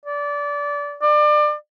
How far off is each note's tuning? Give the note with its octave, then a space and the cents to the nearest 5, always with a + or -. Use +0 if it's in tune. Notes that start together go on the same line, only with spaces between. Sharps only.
D5 -20
D5 +30